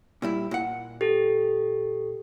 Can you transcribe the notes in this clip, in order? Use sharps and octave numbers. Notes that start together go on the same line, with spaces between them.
A#2 G3 E4
A#2 F#5
G4 A4